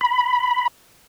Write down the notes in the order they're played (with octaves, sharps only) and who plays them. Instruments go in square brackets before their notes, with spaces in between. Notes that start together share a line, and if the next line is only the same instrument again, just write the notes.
[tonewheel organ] B5